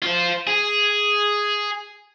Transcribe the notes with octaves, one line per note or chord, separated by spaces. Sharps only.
F4 C5
G#4